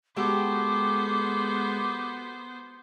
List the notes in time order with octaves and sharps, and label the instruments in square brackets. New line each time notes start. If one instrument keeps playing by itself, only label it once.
[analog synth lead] G#3 [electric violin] B3 C5 [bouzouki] F#4 G4 A4 [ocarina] D6